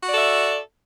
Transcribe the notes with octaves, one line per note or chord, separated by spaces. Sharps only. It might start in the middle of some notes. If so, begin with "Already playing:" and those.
F#4 A4 D5 E5